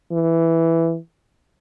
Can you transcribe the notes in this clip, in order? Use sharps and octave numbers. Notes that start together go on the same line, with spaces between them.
E3